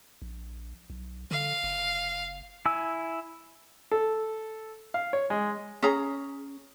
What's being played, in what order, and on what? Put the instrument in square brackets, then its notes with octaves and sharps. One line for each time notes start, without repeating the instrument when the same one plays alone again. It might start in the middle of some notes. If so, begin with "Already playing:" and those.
[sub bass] A#1
B1
[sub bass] D3 [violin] F5
[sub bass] F#1
[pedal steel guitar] E4 G#5 E6
[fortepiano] A4
F5
C#5
G#3
[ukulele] C#4 G#4 A#5